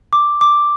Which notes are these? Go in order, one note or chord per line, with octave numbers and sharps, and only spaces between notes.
D6
D6